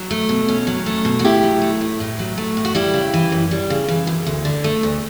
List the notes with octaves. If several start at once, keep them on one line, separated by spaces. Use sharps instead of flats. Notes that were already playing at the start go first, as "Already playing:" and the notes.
Already playing: F#3
A3
B2
C#4
F#3
A3
B2
F#4
A2 E4 G4
F#3
A3
A2
A2
F#3
A3
A2
F#4
G3 E4 G4
C#3
E3
F#2
G3
C#3
E3
F#2
D2
D3
A3
D2